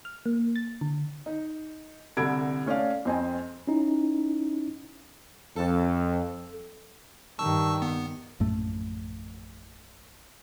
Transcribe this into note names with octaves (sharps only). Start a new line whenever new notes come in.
F6
A#3
A6
D3
D#4
C2 D3 B5 E6 G#6 D7
A3 C#4 D5 F5
F2 C4 D#5 G#5
C#4 D#4 E4
F2 A4
G2 D#3 A5 C#6 E6
B3
A#1 F#2 A2 A3